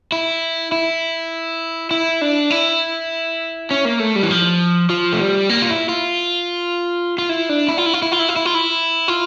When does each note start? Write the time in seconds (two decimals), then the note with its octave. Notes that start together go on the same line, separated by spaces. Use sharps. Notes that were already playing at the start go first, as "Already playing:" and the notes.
0.12 E4
0.72 E4
1.91 E4
2.21 D4
2.50 E4
3.71 C#4
3.85 A#3
4.00 A3
4.16 G3
4.23 E3
4.31 F3
4.90 F3
5.13 A3
5.20 G3
5.49 A#3
5.62 F4
5.70 E4
5.89 F4
7.18 F4
7.29 E4
7.49 D4
7.68 E4
7.78 F4
7.86 E4
7.94 F4
8.02 E4
8.12 F4
8.19 E4
8.29 F4
8.36 E4
8.45 F4
8.54 E4
9.08 F4